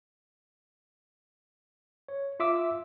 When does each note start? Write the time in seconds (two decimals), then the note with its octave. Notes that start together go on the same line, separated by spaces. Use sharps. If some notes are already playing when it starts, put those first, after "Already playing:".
2.08 C#5
2.40 F4 E5 D6 E6